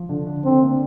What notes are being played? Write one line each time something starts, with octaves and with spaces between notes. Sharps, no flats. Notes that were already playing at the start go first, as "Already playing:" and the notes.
Already playing: F3
D3
D4
D3 C4
A#3